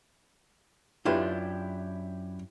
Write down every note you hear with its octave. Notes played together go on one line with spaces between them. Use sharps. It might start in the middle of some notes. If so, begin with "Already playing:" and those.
F#2 D4 E4 F4 G4 B4